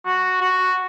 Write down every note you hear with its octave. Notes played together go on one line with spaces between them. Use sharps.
F#4
F#4